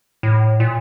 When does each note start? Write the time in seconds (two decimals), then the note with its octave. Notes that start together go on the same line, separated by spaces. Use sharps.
0.23 A2
0.60 A#2